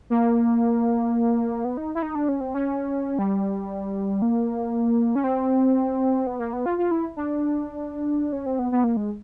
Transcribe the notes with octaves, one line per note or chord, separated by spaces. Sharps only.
A#3
B3
D#4
E4
D#4
D4
C#4
C4
C#4
G3
A#3
C#4
C4
B3
A#3
B3
F4
F4
E4
D4
C#4
C4
B3
B3
A#3
G#3